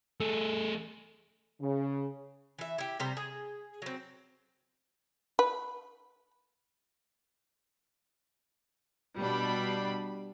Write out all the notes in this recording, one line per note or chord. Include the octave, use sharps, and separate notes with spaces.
A3 G#4 A4
C#3
E3 E5
E4 G4
C3 G3 C5 A#5
G#4
F#3 C4
B4
B2 G3 D4 B5